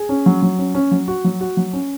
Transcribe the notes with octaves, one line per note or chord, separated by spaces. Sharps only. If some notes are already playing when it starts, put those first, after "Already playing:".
Already playing: G#4
C#4
F#3
F#3
C#4
C#4
F#3
F#4
F#3
F#4
F#3
C#4